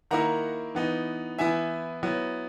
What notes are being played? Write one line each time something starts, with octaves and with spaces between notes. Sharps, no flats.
D#3 A#3 E4 F#5 A#5
E3 B3 D#4
E3 B3 E4 E5 G#5
F#3 B3 E4